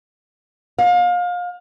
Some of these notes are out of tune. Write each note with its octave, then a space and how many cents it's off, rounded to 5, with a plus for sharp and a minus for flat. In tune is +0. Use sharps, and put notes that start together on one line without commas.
F5 +30